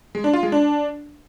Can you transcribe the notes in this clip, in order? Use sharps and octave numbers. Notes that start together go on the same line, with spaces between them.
G#3
D4
F4
G#3
D4